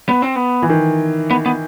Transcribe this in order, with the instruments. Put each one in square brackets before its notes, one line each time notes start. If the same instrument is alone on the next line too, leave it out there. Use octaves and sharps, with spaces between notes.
[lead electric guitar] B3
C4
B3
[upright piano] E3
D#3
[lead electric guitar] B3
B3